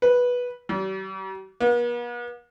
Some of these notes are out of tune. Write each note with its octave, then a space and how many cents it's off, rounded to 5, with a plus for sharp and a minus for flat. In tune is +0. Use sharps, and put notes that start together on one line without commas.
B4 -10
G3 -45
B3 -45